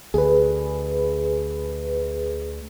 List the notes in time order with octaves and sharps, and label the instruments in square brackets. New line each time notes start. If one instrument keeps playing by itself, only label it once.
[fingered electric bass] D2 [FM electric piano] G#4 B4